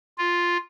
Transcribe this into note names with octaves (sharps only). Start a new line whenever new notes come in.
F4